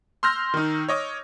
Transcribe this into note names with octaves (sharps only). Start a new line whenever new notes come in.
C6 E6 F6 G6 A#6
D#3 D#4
C#5 D#5 D6